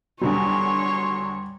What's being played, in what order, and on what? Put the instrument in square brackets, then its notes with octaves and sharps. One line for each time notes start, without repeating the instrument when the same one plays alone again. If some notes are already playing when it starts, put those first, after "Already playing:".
[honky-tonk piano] E2 D3 F#3 [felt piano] G3 [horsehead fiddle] C#5 [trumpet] C6